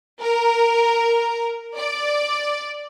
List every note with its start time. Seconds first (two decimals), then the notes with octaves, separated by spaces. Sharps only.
0.21 A#4
1.77 D5